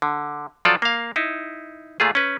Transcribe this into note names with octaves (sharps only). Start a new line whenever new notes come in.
D3
F3 F#3 F4 A4 D5
A#3 F5
D#4 E4
A#2 A3 F4 G#4
C#4 B4